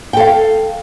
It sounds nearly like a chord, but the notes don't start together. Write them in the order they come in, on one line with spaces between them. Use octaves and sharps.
G5 A4 F5